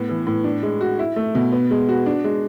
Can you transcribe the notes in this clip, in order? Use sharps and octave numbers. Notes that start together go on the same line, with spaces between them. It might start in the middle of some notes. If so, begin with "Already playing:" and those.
Already playing: A2 B3
E3
A2
D4
G#3
F#4
E4
A3
B2
B3
G#3
F#4
D4
G#3